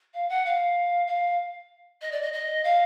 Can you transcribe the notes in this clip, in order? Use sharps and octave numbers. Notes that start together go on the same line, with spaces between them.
F5
F#5
F5
F5
D#5
D5
D#5
D#5
F5